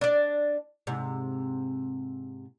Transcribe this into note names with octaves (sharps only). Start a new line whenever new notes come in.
D4 D5
G#2 C3